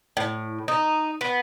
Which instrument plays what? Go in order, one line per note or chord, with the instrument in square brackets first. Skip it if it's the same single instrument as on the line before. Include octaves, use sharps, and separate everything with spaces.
[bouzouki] A2
D#4
B3